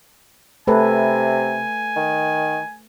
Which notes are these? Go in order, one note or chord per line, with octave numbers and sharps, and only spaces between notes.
C3 A3 A4 B4 G#5
D#3